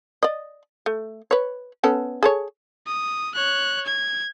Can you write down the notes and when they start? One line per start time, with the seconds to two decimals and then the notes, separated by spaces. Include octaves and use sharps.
0.23 D5 D#5
0.86 A3
1.31 B4 C#5
1.84 B3 C#4 A4
2.23 G#4 A4 C#5
2.87 D#6
3.35 C#5 F#6
3.86 G#6